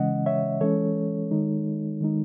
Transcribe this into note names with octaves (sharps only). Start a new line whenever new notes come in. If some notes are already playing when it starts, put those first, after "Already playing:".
Already playing: C#3 E3 G#3 C#4 D#5 F#5
C#5 E5
E3 G#3 C#4 A4 C#5
D#3 G#3 D#4
D#3 G#3 D#4